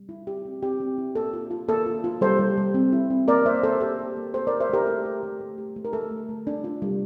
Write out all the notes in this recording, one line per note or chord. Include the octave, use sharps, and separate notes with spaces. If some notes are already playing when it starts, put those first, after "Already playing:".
Already playing: G3
E4
G4
C4
C4 G4
C4
E4
A#3 A4
F4
F4
A#3 A4
F4
F4
G3 A4 C5
G3
G3
C4
E4
C4
A#3 A#4 D5
A#3 C5 E5
A#3 A4 C5
G4 A4
G4
A#3
A3 A4 C5
G4 A#4 D5
C5 E5
A3 G4 A#4
E4 A4
G4
A3
A3
G4
A3
A#4
A3 A4
A3
A3
D4
F4
G3